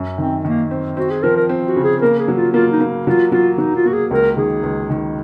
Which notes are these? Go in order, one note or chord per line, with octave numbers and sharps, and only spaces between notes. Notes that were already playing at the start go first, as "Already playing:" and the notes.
Already playing: F#2
D#3 C4
D#3 A#3
C4
C4 F#4
G#4
F3 A#4
A#4
C4
F#4
C#3
G#4
A#3 A#4
G#4
F#3
F4
A#3 F4
D#4
A#3
F#3 F4
F#3 F4
F#3 D#4
F4
A#3 F#4
G#4
C#2 A#4
D#3 G#4
C#2
D#3